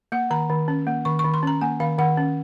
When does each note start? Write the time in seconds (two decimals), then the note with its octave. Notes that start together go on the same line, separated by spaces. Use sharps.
0.12 A#3 F#5
0.30 D#3 A#5
0.49 D#3
0.68 C#4
0.87 A#3
1.05 D#3 C#6
1.19 C#6
1.24 D#3
1.34 C6
1.43 C#4 A#5
1.61 A#3 G#5
1.80 D#3 F5
1.98 D#3 F#5
2.17 C#4